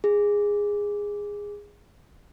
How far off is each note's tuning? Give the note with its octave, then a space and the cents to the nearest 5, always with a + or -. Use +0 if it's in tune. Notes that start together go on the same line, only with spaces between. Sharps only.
G#4 -15